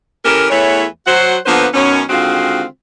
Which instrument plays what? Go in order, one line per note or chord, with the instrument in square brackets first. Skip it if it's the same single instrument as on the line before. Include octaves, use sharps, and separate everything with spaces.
[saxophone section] E3 C#4 G4 A4 A#4
E2 E3 A3 E4 C#5
F#3 C5 F#5
D3 F3 A#3 B3 B4 C5
F#2 B2 D#3 C#4
D3 D#3 G#3 C4 F4 F#4